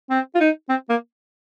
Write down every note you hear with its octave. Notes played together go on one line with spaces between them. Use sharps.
C4
F4
D#4
C4
A#3